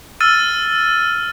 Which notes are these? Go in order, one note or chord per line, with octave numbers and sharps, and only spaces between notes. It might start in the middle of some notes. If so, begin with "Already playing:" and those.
E6 F6 A6 D#7